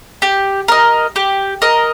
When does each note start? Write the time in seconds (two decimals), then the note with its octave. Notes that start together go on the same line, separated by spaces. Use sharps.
0.22 G4
0.68 A#4 D#5
1.16 G4
1.62 A#4 D#5